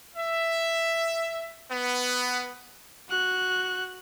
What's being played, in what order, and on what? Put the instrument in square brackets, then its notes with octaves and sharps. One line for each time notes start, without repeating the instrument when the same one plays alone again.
[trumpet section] E5
B3
[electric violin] F#4 F#6